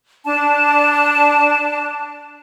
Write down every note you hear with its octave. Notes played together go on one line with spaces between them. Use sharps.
D4 A5